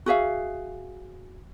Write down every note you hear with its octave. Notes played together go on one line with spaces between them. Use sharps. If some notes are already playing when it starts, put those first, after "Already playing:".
F#4 G#4 E5 F5